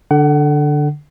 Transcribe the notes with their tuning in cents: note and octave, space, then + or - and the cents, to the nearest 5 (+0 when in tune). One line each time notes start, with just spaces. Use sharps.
D3 +0 F#5 +30